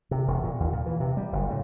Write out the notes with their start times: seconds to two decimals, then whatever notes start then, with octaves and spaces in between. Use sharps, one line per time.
0.11 C3
0.28 E1
0.44 A#2
0.60 D#2
0.73 A#2
0.86 E3
1.00 C3
1.17 G3
1.33 F#1
1.50 A2